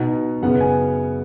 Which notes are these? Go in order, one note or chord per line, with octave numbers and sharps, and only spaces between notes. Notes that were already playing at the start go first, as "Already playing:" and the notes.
Already playing: B2 B3 D#4 F#5
F#2 C#3 B3 F#5
G#5